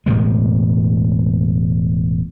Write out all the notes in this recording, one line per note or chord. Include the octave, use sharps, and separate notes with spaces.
E1 A2 C3 G#3